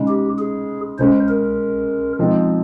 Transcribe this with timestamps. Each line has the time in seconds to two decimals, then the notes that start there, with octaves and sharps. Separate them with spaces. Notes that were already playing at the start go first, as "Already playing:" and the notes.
Already playing: C#3 G#3 D#4
0.08 G4
0.39 G#4
0.99 C#3 G#3 C#4 C5
1.28 A#4
2.19 F3 G#3 C4 D#4